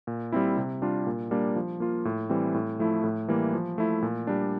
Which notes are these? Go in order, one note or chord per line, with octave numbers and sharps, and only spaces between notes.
A#2
G3 C4 E4
C3
G3 D4 F4
A#2
G3 A#3 D4
F3
A#3 F4
A2
E3 G3 C4
A2
F3 A3 E4
A2
E3 G3 A#3
F3
A3 E4
A#2
G3 D4